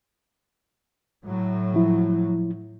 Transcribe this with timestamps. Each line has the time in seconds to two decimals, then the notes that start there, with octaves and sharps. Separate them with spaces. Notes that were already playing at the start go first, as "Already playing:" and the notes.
1.25 A2 F#3
1.74 F3 E4